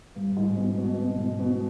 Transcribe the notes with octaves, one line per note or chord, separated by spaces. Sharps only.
G2
G#2
B2
B2
B2
G#2
B2